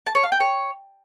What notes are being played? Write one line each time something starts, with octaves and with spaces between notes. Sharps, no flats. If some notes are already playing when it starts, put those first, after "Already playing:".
A5
C#5
F5
G5
C#5